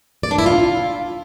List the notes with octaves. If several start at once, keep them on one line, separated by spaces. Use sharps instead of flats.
D5
D4
E4
F4